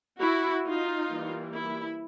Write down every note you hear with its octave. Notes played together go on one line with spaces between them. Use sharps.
E4 F#4
D#4 F4
E3 G3 A#3
E4